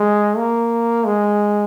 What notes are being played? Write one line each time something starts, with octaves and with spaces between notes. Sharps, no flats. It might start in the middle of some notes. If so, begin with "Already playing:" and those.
Already playing: G#3
A#3
G#3